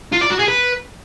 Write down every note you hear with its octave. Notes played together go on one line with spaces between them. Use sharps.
F4
D5
F#4
G#4
B4